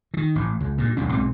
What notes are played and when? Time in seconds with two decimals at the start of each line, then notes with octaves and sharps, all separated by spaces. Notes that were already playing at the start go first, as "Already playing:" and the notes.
0.14 D#3 E3
0.36 A1 A2
0.61 C#2
0.78 G2 A#2
0.97 E1 B1 G2 C#4
1.11 B1 G#2 B2 C4